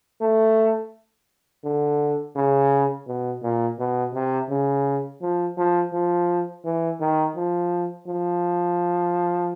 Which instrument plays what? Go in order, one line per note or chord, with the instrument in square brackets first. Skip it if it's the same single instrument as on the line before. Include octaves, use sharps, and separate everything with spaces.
[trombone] A3
D3
C#3
B2
A#2
B2
C3
C#3
F3
F3
F3
E3
D#3
F3
F3